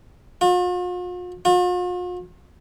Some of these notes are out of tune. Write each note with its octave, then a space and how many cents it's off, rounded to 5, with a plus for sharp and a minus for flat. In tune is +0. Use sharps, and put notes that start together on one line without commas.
F4 +45
F4 +45